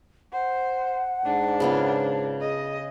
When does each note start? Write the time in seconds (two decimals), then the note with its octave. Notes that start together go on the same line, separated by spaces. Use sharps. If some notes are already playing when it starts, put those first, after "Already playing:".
0.33 C5 F#5
1.25 G#2 D4
1.60 C#3 B3 F4
2.41 G#4 D#5